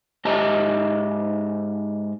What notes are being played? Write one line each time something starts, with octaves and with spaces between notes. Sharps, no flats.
G#2 G4 D#5 E5 A5 A#5